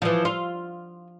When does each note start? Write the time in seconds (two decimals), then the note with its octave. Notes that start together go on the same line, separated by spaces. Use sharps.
0.02 E3 F3
0.25 F4